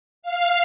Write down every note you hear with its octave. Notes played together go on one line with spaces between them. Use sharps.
F5